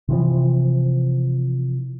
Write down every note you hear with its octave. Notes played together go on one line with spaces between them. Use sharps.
C3 E3 F3